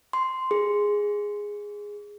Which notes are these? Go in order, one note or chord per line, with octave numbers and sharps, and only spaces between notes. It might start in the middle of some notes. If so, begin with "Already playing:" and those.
C6
G#4